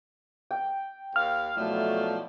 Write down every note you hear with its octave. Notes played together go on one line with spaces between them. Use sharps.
G5
D#2 F5 F6
B2 F3 F#3 A3 E4 D5